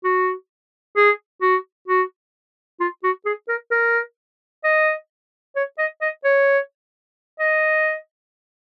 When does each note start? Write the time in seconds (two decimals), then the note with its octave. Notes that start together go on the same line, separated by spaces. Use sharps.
0.05 F#4
0.97 G#4
1.42 F#4
1.88 F#4
2.80 F4
3.04 F#4
3.26 G#4
3.49 A#4
3.72 A#4
4.64 D#5
5.56 C#5
5.79 D#5
6.02 D#5
6.24 C#5
7.40 D#5